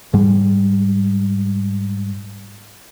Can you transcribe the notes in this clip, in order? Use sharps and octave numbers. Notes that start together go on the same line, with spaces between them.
G#2 G3